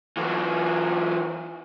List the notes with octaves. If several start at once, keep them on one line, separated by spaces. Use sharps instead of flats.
E3 F#3